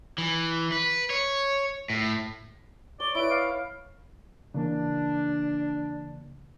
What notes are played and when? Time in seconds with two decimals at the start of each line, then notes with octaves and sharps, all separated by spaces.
0.18 E3
0.72 B4
1.10 C#5
1.90 A2
3.00 C#5 D5 G7
3.15 E4 B4 C#5 D7
3.30 F5
4.54 C#3 E3 A#3 D4